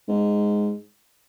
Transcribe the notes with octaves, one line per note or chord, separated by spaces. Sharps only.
G#2